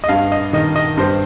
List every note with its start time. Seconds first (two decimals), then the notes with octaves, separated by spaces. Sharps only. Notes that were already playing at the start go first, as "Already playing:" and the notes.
0.04 D#5
0.09 G2 F5
0.32 D#5
0.53 D#3 D#5
0.76 D#5
0.97 G2 C5